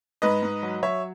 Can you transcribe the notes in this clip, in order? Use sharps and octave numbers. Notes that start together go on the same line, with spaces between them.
G#2 B4 D#5
G#2
F#3
F#3 C#5 E5